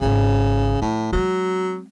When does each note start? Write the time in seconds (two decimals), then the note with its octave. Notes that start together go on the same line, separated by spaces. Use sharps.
0.01 G#1 C#3 F4
0.82 A2 F3
1.12 F#3 G#3 C4